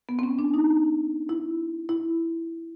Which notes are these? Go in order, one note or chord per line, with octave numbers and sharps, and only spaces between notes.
B3
C4
C#4
D4
D#4
E4
E4